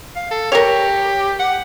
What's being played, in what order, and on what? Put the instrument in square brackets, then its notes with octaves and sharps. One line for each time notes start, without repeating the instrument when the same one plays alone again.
[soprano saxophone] F5
A4
[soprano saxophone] G4 [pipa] A#4 C#5
[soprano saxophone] F#5